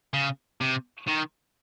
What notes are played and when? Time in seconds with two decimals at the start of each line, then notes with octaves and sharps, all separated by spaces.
0.14 C#3
0.61 C3
1.07 D#3